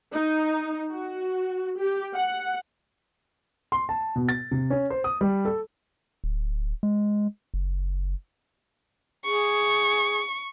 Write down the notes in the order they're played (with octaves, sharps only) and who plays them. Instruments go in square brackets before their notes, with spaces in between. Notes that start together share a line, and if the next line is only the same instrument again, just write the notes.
[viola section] D#4
F#4
G4
F#5
[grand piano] C6
A5
B2
A6
C3
C#4
C5
D#6
G3
A4
[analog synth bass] D1
G#3
F#1
[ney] G#4 [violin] C#6